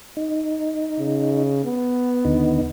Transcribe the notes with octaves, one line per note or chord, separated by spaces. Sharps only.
D#4
C#3
B3
D#2 D3 D#4